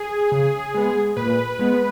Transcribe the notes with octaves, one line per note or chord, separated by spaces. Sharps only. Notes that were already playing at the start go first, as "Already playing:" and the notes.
Already playing: G#4
C#3
G#3 B3
A#2 B4
G#3 B3